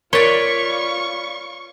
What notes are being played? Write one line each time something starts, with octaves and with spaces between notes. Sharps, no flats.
F4 A#4 B4 C#5 D5 C#6 A6